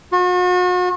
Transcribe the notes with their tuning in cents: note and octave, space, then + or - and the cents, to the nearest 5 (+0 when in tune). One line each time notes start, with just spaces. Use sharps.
F#4 -40